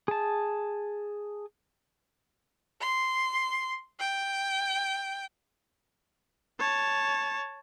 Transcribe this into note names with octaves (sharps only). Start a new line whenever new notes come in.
G#4 A5
C6
G5
C#5 A5